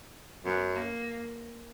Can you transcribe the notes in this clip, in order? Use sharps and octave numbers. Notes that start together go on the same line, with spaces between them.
F#2 B3
A#3